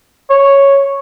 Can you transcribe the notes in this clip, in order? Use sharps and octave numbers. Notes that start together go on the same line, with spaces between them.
C#5